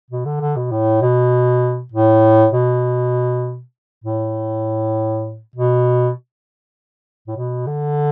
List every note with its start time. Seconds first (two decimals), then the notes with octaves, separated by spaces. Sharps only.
0.11 B2
0.25 D3
0.41 D3
0.56 B2
0.71 A2
1.01 B2
1.92 A2
2.53 B2
4.04 A2
5.56 B2
7.27 A2
7.36 B2
7.66 D3